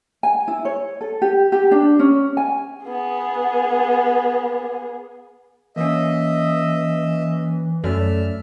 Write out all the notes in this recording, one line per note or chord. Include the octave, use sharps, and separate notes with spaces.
G#5
E4
C#5
A4
G4
G4
D4
C#4
G#5
B3 G#4
E3 A#3 C#4 D#5 E5
F#2 A3 C#4 A4 D5 E5 F6